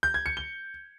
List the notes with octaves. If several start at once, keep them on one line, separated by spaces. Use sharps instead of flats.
G6
G#6
C#7
G7